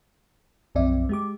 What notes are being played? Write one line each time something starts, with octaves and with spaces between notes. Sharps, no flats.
B1 F#2 F3 C4 D5 E5
G#3 G4 D6